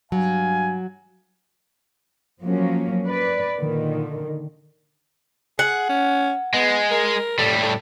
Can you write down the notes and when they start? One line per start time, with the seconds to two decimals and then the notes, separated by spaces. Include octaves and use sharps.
0.12 G2 F#3 F5 G#5
2.42 F3 F#3 A#3 C#4
3.07 B4 D5
3.59 A#2 D3 D#3
5.59 G#4 F#5
5.89 C#4
6.54 G#3 B3
6.91 A#4
7.38 A2 G3 A4
7.63 A4